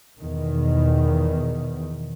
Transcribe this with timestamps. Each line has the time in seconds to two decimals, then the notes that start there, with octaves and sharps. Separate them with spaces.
0.20 E2 B2 D#3